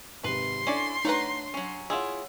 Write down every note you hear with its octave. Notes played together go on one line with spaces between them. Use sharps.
G#1 C3 B4 C6
C#4 D4 E4 A4 D5
A3 D4 D#4 B4 C#5 F#5 A#5
F#3 C#4
E4 F4 G#4 C#5 F#5 E6